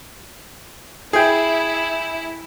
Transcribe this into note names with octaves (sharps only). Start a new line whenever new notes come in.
E4 G#4 G5